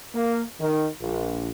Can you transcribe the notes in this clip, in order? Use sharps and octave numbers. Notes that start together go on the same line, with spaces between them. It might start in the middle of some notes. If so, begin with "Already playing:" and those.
A#3
D#3
A#1